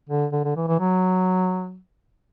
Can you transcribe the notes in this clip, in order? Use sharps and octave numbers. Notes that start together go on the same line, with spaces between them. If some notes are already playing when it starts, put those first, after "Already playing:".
D3
D3
D3
E3
E3
F#3